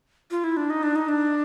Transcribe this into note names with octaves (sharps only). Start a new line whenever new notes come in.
F4
E4
D4
D#4
D4
D#4
D4